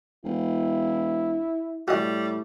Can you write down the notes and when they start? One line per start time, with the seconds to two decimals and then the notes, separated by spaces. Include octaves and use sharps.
0.24 E1 E4
1.88 A2 G3 F#4 D#5